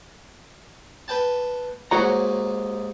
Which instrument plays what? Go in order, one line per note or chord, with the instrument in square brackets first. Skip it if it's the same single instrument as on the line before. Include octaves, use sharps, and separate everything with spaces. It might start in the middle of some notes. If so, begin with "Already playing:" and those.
[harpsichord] B4 G5 A5
[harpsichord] D#2 G#2 [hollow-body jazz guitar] F#4 C#5 A#5